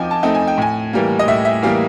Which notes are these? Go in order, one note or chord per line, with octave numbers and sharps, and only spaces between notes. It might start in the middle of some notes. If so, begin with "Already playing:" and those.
Already playing: F3 C4 D#4 G5 G#5 D6
A5
A3 C4 D#4
G#5
G5
A2 G#5
E3 G3 A#3
D#5
A2 E5
E5
E3 G3 A#3 F5